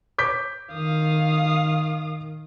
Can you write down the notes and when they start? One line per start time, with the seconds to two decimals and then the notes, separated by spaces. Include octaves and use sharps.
0.18 D6 G6 B6
0.73 D#3 F5 D#6